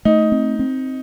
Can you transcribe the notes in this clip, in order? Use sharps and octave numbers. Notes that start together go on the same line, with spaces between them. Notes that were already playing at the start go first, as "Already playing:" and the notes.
A3 D#4
C4
C4